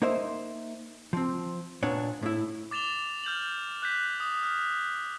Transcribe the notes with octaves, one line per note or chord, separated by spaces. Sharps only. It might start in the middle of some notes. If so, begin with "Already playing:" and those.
A#3 D#4 A#4 C5 E5
F3 C4
A#2 B3 D4 C#5
A2 E4
D6 A6 E7 F7 G7
F6 G6 A6 F#7
F#6 G6 B6
D#6
F6